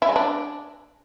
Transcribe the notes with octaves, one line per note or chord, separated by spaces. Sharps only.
E4
G#3
D4